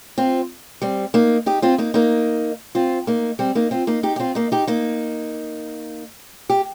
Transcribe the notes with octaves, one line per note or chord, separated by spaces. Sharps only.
C4 F4
G3 C4
A#3 D#4
D#4 G4
C4 F4
A#3 D#4
A#3 D#4
C4 F4
A#3 D#4
G3 C4
A#3 D#4
C4 F4
A#3 D#4
D#4 G4
G4
C4 F4
A#3 D#4
D#4 G4
A#3 D#4
G4